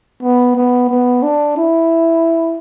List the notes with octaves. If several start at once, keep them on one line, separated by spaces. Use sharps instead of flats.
B3
B3
B3
D4
E4